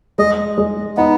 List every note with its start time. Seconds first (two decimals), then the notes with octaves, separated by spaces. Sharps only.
0.18 G#3 D#5
0.58 G#3
0.97 B3 D#4